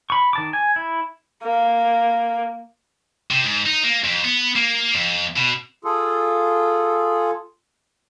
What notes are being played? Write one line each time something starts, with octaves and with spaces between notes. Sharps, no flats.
B5 C#6
D#3 A5 D6
G#5
E4
A#3
C3
G#2
D#4
A#3
F2
B3
A#3
F2
B2
F4 G#4 A4